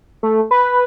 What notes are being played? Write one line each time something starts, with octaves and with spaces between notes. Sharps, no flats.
A3
B4